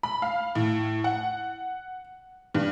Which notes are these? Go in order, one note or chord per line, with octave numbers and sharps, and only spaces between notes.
B5
F5
A2
F#5
G2